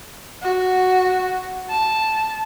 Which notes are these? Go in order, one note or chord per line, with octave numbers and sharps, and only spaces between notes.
F#4
A5